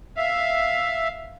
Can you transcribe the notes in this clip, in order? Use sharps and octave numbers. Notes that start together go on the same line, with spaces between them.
E5 F5